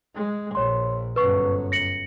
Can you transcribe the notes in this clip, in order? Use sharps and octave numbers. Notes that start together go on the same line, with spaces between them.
G#3
A#1 C#5 C6
G1 F#2 B4 C#6
A#6 C#7 F#7